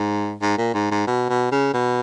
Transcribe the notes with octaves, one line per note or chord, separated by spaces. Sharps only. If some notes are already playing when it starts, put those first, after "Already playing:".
Already playing: G#2
G#2
A#2
G#2
G#2
B2
B2
C#3
B2